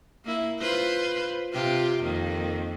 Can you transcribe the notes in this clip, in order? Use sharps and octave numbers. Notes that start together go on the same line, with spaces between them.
A#3 E4
F4 B4 C5
C3 F4 G4
F2 D#3 A#3